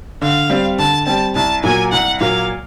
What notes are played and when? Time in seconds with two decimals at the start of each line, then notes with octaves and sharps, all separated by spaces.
0.22 D3 F5
0.50 G3 C4
0.79 D3 A5
1.07 G3 C4 A5
1.35 C2 A5
1.64 A#2 F#3 A#3 G#5
1.92 C2 F#5
2.20 A#2 F#3 A#3 F5